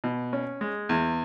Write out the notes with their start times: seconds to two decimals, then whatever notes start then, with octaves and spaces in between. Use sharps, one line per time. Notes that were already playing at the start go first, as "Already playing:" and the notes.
0.04 B2
0.33 C#4
0.61 G#3
0.89 E2